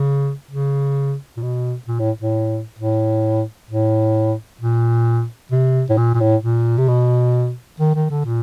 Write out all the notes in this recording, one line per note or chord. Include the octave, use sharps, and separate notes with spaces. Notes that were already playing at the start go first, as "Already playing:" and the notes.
Already playing: C#3
C#3
A#2
B2
A#2
A2
A2
A2
A2
A#2
C3
A2
A#2
A#2
A2
A#2
C3
B2
D#3
D#3
D3
A#2